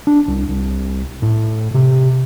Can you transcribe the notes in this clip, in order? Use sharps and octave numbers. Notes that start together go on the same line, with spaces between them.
D4
C2
C2
A2
C3